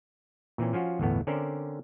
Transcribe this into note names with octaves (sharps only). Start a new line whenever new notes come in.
A#2 E3 C4 C#4
F3 C#4 F4 F#4
G1 E2 A2 B3
D3 C4 C#4 A#4 C5 D5